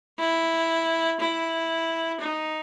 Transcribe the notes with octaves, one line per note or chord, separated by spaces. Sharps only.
E4
E4
D#4